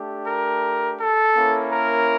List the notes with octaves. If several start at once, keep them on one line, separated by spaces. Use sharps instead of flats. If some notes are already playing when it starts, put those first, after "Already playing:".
Already playing: A3 D4 G4
A#4
A4
A#3 C#4 E4
A#4